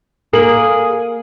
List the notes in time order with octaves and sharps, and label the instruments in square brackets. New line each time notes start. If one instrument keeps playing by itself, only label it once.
[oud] A#3 [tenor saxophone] G#4 [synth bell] A4 F#7